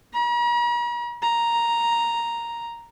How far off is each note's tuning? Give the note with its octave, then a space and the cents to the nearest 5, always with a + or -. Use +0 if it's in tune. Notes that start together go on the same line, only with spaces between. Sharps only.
A#5 +45
A#5 +0